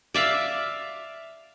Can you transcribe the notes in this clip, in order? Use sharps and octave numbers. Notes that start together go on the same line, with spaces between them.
D5 E5 F5